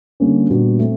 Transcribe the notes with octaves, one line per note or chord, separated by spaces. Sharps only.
D3 G3 A#3 C#4
A#2 G3 B3 D4 F#4
A3 C4